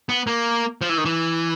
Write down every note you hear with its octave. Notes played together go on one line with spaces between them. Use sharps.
B3
A#3
F3
E3
D#3
E3